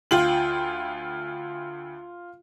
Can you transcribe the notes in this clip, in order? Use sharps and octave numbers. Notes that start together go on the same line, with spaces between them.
D2 F4 G5 F#7